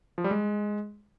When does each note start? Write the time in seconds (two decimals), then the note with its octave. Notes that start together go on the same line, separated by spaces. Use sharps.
0.18 F3
0.24 G3
0.31 G#3